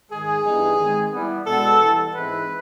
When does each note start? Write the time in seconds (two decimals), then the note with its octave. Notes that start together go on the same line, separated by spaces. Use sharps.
0.10 G#2 D#3 G#3 G#4
0.44 G2 E3 G3 B3 D#4
0.77 D#3 G#3 C4
1.12 E3 G3 B3
1.46 B2 G#3 B3 D4 A4
1.80 E3 G3 B3
2.14 G#2 E3 G#3 C4 E4 B4